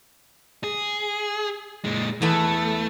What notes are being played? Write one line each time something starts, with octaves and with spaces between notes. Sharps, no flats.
G#4
A#2 G#3
E2 A3 B3 A4